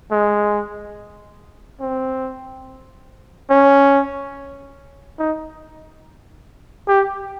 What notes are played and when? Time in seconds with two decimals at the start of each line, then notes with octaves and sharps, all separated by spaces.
0.11 G#3
1.81 C4
3.50 C#4
5.19 D#4
6.88 G4